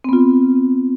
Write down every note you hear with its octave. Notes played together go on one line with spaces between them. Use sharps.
B3 C4 F4